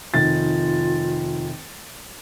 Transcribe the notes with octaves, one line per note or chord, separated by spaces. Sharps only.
F1 D#3 F4 A6